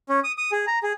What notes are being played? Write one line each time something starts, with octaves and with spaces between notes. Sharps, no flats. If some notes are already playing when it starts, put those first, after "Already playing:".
C#4
D#6
D#6
G#4
A#5
G#4